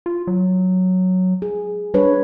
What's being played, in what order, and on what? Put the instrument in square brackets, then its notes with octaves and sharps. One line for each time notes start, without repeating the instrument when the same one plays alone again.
[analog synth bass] F4
F#3
[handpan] G#4
[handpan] G3 B4 C#5 [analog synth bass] D4